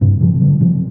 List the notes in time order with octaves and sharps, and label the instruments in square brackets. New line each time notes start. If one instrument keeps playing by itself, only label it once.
[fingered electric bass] G2 C3
C3 F3
D3 G3
C3 F3